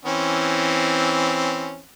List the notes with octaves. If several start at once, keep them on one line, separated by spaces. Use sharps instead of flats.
E3 C4 C#4